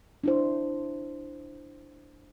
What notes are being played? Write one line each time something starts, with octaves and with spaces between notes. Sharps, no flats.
D4 E4 C5